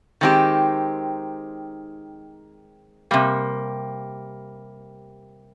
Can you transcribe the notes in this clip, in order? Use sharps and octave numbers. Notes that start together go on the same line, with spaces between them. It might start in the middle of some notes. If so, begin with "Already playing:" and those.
D#3 G#3 C4 D#4 G4
C3 G3 A#3